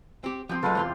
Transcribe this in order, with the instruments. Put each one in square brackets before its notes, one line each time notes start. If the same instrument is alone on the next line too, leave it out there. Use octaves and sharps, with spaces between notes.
[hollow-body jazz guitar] C4 G4
[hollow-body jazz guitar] F3 C4 [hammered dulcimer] G4 G5 C6
[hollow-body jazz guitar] C#3 F#3 G#3 [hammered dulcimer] F4 G4 [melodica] A4 B4
[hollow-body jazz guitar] E2 F4 C6 [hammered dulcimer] C3